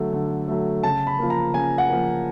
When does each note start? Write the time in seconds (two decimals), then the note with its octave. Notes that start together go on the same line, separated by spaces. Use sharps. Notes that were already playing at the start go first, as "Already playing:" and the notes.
Already playing: D3 F#3 A3
0.13 D3
0.48 F#3 A3
0.83 C#3 A5
1.07 B5
1.19 F3 A#3
1.30 A#5
1.54 C#3 G#5
1.78 F#5
1.90 F3 A#3